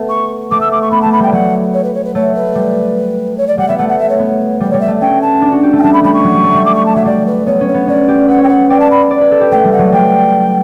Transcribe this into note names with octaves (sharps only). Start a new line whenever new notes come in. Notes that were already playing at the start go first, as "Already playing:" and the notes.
Already playing: A3 B3
C#6
A3 D6
E6
D6
C#6
B3 B5
A3 A5
B5
G3 G5
F#3 F#5
C#5
B4
C#5
B4
A3 C#5
B4
G3
C#5
D5
G3 F#5
B3 E5
A3 F#5
F#5
E5
C#5
B3
G3 B4
G3 C#5
E5
A3
C#4 G5
A5
D4
F#4
G4
A3
G5
G3 A5
B5
G3 B5
C#6
F#3
G3
A3
G3
D6
C#6
A5
F#3 E5
G3 D5
B4
B3 C#5
C#4
C#5
B3
C#4 D5
G4
B4 F#5
C#5
G5
B4 F#5
D5 G5
A5
B5
D5
B4
A4
G4
A3 G5
G3
F#5
F#3
G3 G5